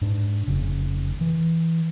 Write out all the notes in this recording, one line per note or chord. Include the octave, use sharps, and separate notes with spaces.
G#2 D4
F1 C#3
E3